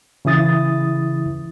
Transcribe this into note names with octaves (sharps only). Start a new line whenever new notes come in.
C#3 E3 E4 D#6 A6